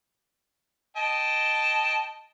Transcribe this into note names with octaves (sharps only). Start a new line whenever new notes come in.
D#5 G5 A5